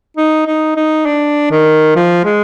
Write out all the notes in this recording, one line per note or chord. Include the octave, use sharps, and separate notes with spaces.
D#4
D#4
D#4
D4
D#3
F3
G#3